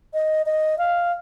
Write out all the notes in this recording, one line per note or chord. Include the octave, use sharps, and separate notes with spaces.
D#5
D#5
F5